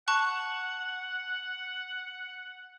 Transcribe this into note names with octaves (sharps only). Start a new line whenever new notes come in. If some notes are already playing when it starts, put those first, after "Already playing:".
F#5 A5 C#6 F#6